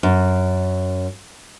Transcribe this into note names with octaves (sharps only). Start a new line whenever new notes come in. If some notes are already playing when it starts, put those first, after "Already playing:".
F#2